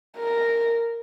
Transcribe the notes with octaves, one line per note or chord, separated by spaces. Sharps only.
A#4